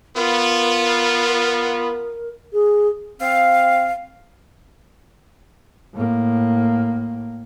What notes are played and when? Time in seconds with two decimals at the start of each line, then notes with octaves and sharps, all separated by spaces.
0.16 B3 F4 A#4
2.53 G#4
3.20 C4 F5
5.94 A2 A#3